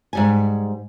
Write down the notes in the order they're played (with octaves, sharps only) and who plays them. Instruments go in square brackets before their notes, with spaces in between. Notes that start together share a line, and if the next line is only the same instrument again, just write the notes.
[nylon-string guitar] G#2 G3 G#5